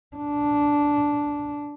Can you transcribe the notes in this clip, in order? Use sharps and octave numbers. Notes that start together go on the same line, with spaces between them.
D4